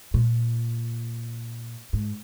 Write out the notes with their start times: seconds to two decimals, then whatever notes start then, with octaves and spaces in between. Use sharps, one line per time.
0.14 A#2
1.93 G#2